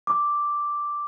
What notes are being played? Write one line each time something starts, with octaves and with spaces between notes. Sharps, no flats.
D6